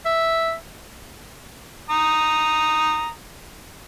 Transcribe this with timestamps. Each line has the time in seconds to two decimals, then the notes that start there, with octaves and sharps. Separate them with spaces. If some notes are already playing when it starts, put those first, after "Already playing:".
0.06 E5
1.90 A#5 D#6